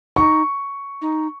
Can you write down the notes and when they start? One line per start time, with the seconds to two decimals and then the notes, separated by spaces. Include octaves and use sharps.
0.16 D#4 C#6
1.02 D#4